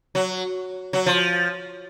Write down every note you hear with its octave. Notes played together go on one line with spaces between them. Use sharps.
F#3
F#3
F3